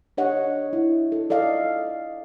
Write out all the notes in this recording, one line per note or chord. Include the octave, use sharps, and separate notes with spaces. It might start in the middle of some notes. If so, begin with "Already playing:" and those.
D4 G4 C#5 D#5 F#5
E4
A4
A4 D5 D#5 F5